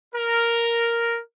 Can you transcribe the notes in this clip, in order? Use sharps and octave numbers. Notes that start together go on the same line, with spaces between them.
A#4